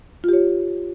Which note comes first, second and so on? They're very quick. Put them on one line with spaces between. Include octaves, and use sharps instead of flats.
F4 G4 C#5